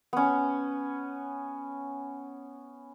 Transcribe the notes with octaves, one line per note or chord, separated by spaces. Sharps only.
B3 C#4